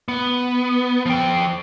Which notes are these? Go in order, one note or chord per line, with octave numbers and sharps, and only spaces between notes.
B3
F3 G5